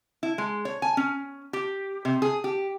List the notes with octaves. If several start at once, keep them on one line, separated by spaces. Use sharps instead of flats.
E4
G#3
C#5
G#5
C#4
G4
C3
G#4
G4